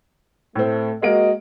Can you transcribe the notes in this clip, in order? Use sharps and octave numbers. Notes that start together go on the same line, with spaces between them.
A2 A3 C4
G#3 A#3 F#4 D#5 D7